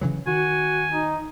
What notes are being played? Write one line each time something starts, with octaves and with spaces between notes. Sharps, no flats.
C#3 E3 F#3
D#3 F#4 G#5
D#4